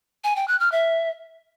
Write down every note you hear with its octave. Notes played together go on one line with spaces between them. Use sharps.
G#5
G5
F#6
F6
E5